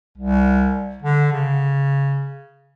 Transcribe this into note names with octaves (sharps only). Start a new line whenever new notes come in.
C2
D3
C#3